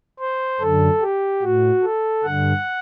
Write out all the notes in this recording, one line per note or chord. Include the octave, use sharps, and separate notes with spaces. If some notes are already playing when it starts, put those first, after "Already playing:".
C5
F#2 D3 A4
G4
A2 F#4
A4
G2 D3 F#5